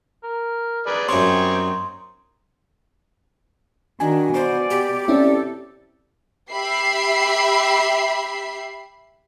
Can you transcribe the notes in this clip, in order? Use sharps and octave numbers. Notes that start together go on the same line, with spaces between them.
A#4
D#4 G#4 B4 D5
F#2 G3 C4 C#5 C6
D#3 D4 F#4 G#5
B2 C5 D5
G4
C4 C#4 E4 A4 D5
G4 E5 B5 C7